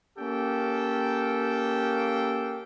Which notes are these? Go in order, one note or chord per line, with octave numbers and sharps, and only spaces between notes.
A#3 C#4 G4 A4 G5